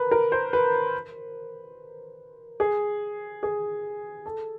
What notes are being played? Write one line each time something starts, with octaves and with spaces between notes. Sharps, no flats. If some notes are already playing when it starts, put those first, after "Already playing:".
Already playing: A#4 B4
A#4
C5
B4
G#4
G#4
A4